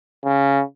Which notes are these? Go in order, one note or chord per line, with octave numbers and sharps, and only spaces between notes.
C#3